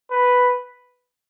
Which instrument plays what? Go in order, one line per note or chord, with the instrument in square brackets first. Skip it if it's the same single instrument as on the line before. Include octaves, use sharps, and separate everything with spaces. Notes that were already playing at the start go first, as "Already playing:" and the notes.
[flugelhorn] B4